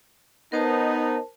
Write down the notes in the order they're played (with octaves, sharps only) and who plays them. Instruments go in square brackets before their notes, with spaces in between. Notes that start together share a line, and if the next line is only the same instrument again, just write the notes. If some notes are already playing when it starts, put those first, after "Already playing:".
[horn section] B3 D#4 [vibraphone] A#4 C5 A5